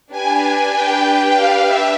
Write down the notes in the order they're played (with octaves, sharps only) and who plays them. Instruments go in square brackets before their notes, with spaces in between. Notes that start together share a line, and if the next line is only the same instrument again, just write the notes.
[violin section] D4 G4 B4 [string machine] G#5
[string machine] G5
F5
E5